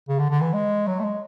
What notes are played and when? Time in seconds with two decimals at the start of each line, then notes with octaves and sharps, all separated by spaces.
0.09 C#3
0.19 D3
0.30 D3
0.41 E3
0.53 G#3
0.87 F#3
1.00 A3
1.04 G#3